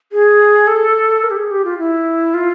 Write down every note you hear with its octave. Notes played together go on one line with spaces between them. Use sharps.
G#4
A4
A#4
G4
G#4
G4
F4
E4
F4